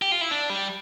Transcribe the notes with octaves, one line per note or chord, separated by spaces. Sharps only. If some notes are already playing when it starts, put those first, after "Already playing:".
G4
F4
E4
D4
G3